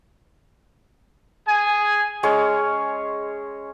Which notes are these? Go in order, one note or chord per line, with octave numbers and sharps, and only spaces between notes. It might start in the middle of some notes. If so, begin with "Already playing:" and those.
G#4 G#5
G#3 C#4 G#4 C#5